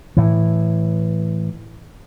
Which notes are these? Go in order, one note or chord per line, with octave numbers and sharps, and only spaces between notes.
A2 E3